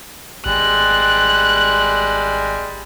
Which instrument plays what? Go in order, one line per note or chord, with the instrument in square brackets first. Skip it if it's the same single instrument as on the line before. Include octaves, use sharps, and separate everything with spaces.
[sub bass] G#1 [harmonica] G3 G#3 [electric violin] F#6